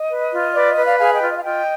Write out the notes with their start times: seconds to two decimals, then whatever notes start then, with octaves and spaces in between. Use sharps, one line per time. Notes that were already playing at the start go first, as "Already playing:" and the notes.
Already playing: D#5
0.10 B4
0.32 F4
0.54 B4 D5
0.69 D#5
0.77 B4
0.84 D5 F5
0.99 G#4 F5 G#5
1.14 D#5 G5
1.21 F4
1.29 D#5
1.37 F5
1.43 F4 D#5 G5